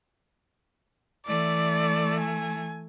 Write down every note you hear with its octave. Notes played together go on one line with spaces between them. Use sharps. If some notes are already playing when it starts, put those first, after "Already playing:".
E3 A3 D5
G#5